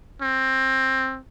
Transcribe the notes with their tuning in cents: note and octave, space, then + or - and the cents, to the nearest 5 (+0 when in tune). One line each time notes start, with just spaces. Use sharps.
C4 +15